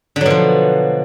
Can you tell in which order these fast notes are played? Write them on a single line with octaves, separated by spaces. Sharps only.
D3 F#3 B2 F3